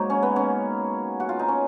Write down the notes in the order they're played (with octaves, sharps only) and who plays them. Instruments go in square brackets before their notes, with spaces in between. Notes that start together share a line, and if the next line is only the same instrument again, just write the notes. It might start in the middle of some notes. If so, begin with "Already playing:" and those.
Already playing: [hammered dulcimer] G#2 F#3 A#3 D#4 C#5
C#4
B3
C#4
F#4
F4
D#4
C#4